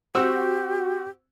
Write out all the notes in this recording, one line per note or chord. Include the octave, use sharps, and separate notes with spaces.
C4 F#4 G4 E6